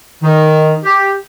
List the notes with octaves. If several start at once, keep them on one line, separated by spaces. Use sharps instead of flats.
D#3
G4